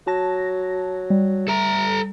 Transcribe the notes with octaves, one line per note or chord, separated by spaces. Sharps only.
F#3 F#4 A5 A#6
G3
A3 A4 A#5